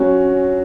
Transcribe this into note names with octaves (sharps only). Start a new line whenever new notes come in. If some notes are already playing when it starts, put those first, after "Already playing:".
Already playing: F#3 C#4 F#4